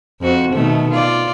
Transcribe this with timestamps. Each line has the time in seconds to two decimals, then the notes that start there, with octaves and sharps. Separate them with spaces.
0.21 F2 C4 F#4
0.52 B2 D#3 A3
0.91 F4 D5